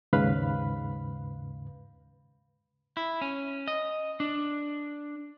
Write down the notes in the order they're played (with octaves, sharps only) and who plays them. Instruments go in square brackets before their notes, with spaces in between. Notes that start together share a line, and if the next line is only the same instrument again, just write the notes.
[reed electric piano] D#2 G#2 C#3 B4 F5 B5
[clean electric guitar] E4
C#4
D#5
D4